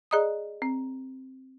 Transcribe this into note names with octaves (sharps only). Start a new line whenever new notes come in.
G#4 D5 D#5 A#5 B5 D#6
C4